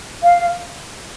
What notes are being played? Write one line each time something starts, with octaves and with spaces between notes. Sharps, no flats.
F5